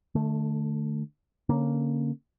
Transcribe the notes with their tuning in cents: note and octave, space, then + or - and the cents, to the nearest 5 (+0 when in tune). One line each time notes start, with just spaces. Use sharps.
D3 +30 A3 -5
D3 -20 A#3 +0 C#4 -10